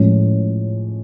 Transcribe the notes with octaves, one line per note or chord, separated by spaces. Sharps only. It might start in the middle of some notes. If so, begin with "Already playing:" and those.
Already playing: A2 F3 G#3 C#4